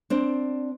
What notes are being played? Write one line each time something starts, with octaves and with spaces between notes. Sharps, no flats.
C4 D4